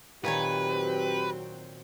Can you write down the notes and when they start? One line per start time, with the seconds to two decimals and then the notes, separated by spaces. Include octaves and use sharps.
0.25 A#2 D#3 F#3 C4 G4 B4 C#5